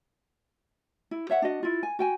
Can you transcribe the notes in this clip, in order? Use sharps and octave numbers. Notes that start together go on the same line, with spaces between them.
E4
C#5 E5 F#5
D4 F#4 D#5
E4 F4
G#5
F#4 G5 G#5